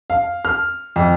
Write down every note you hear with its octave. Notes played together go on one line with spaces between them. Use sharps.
F5
F6
F2